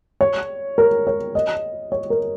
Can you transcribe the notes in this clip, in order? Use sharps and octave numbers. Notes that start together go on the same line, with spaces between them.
C#5
A#4
C#5
D#5
C#5
A#4